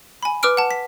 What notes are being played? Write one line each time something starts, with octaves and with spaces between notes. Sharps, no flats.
G#5 B5
B4 D6 E6 F6 D7
F#5 A5
B6